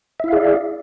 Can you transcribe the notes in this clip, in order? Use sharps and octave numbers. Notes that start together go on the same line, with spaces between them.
E4 G#4 D5 E5 F5